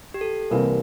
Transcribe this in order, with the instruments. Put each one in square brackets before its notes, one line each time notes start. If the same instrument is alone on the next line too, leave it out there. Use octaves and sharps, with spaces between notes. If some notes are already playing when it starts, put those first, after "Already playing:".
[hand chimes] G4
A4
[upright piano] C2 C3 E3 A#3 [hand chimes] A#4